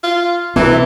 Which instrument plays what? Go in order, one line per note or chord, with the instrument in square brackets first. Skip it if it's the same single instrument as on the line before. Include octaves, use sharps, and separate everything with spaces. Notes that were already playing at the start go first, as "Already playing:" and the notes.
[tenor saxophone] F4
[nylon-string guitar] C3 C4 B4 [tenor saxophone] E3 [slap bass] B3